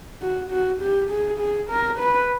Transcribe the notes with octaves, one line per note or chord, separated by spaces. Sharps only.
F#4
F#4
G4
G#4
G#4
A#4
B4